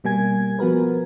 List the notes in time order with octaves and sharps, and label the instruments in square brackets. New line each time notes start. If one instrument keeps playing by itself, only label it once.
[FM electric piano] B2 G3 A#3 G#5 G#6
F3 B3 F#4 A#4 B4